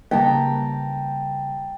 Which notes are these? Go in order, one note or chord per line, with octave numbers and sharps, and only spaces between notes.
C#3 G3 A#3 G5 A5 A#5